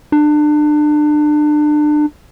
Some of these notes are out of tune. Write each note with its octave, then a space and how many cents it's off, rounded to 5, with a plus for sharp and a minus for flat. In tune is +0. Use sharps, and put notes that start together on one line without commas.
D4 +30